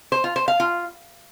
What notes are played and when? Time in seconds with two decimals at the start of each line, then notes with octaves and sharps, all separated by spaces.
0.12 C5
0.24 F4
0.36 C5
0.48 F5
0.60 F4